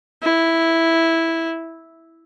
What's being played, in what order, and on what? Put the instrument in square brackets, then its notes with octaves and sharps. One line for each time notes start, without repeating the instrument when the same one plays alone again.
[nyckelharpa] E4